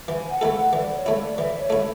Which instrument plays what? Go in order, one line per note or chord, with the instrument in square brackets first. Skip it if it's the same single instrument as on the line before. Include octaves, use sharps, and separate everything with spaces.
[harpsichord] E3 [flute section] G#5
[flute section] F#5
[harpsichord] A3 E4 A4
[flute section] F#5
[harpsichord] E3 [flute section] D5
[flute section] C#5
[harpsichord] A3 E4
[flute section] D5
[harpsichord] E3 [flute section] E5
[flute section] C#5
[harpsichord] A3 E4